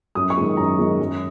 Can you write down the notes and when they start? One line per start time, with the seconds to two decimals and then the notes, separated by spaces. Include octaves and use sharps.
0.15 F#2 D#6
0.30 C#6
0.37 D#3 G#3
0.57 F#2 A#5
0.79 D#3 G#3
1.00 F#2